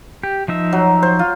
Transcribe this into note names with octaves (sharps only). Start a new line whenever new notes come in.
G4
F3 D#4 E5
F#3
C5
F4